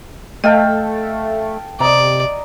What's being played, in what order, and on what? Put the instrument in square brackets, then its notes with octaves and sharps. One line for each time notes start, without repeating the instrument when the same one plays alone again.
[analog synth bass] A3 [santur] A4 F5 G5 [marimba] D#5
[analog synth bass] C3 [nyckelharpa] D5 [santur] D#5 A#5